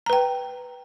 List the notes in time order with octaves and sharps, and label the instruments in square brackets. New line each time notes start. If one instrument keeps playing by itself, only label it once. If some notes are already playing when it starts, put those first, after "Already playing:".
[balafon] A#5
B4
G5